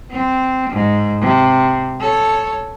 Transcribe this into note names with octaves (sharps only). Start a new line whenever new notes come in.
C4
G#2
C3
A4 C#5